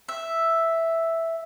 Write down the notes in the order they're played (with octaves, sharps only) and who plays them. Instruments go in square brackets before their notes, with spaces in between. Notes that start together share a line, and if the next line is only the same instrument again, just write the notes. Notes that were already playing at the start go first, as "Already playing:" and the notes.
[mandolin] E5